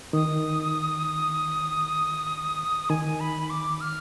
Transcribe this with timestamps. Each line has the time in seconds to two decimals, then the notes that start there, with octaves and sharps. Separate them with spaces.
0.13 D#3 D#6
2.90 D#3 G#5
3.20 B5
3.50 D6
3.81 F6